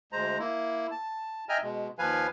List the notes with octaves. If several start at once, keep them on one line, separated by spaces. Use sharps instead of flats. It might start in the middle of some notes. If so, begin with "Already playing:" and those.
D2 G#3 C5 A#5
A#3 E4
A5
D#5 E5 G5 G#5 A#5 F6
B2 G#3
D#2 F3 B4 F5 G#5